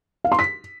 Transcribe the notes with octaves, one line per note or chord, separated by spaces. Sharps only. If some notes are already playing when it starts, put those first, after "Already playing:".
F5
C6
B6